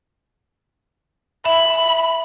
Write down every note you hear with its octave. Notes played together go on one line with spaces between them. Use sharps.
E5 B5